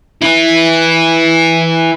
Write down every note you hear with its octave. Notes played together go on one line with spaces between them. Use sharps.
E4 B4